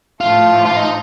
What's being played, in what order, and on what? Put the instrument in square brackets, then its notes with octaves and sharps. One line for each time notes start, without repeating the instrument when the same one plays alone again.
[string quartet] A2 F3 A3 [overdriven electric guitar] F4
[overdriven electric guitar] F4
D#4